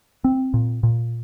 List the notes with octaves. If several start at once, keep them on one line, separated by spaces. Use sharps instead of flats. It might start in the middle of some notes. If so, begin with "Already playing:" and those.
C4
A#2
A#2